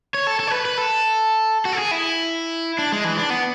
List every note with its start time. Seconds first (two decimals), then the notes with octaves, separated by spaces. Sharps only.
0.14 C#5
0.27 A4
0.40 A4
0.47 C#5
0.52 B4
0.65 B4
0.78 A4
1.65 F#4
1.73 A4
1.78 G#4
1.91 E4
2.79 D4
2.92 G#3
3.04 E3
3.17 D4
3.30 B3